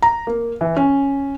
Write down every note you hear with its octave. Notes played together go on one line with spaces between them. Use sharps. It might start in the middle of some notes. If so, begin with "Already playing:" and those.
A#5
A#3
E3
C#4